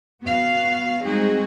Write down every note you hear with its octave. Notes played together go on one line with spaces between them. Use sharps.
B3 F#4 F5
G3 G#3 C4 D#4 F#4 G#4